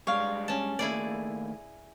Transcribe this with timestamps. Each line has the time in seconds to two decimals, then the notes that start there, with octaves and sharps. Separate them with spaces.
0.07 G3 G#3 D4 C#5 F5
0.48 C#4 A5
0.79 D#2 A3 A#3 E4 G#4 D5